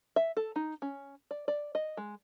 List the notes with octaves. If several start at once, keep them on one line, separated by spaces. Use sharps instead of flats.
E5
A4
D#4
C#4
D5
D5
D#5
G#3